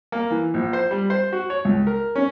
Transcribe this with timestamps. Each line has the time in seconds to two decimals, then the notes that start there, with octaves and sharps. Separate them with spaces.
0.12 A#3
0.31 E3
0.54 A#1
0.73 C5
0.91 G3
1.10 C5
1.33 F#4
1.50 C#5
1.65 C#2
1.87 A#4
2.16 C#4